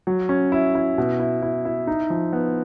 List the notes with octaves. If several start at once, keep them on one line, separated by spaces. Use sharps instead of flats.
F#3
C#4
E4
E4
B2
E4
E4
E4
D#4
F3
B3